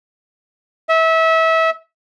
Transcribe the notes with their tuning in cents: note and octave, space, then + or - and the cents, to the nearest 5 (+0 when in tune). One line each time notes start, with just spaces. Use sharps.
E5 -25